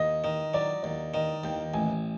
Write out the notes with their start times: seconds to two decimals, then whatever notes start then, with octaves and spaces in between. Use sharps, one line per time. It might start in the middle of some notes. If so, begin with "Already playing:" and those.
Already playing: D#2 D#5
0.24 D#3 D#5
0.54 F#3 D5
0.83 D#2 D5
1.14 D#3 D#5
1.44 D#2 G5
1.74 A1 G#5